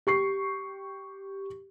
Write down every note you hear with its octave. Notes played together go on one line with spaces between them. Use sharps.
G4 C#6 C7